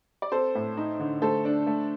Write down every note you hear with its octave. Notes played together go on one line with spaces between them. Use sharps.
D5
C4 A4 C5
A2
D#4
D3
A3 A4 C5
D4
A3